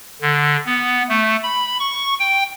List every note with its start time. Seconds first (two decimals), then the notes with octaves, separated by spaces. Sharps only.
0.21 D3
0.66 B3
1.09 A3
1.43 B5
1.79 C#6
2.20 G5